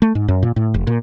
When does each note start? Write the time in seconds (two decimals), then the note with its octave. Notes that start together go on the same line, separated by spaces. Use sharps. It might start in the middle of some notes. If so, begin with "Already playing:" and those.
0.02 A3
0.15 G#2
0.28 F#2
0.43 A#2
0.56 A2
0.74 F1
0.87 A#2